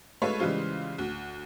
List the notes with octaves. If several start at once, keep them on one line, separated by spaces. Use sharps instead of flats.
G#3 A3 A4 B4 C#5 F5
C#3 E3 G3 G#3 F4 C5
D2